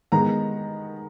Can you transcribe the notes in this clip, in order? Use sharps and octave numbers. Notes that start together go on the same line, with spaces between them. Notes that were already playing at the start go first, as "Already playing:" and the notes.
D#3 G#3 B3 A#5